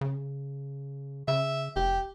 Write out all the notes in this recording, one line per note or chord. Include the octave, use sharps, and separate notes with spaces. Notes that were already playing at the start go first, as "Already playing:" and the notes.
C#3
C#3 E5
F1 G4